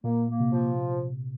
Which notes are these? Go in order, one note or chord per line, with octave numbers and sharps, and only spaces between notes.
A#2 A#3
A#3
C3
F3